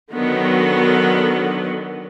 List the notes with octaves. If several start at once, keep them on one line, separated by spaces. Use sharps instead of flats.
D3 D#3 F#3 B3